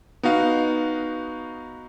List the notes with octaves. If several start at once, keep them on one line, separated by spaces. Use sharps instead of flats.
B3 D#4 F#4 F5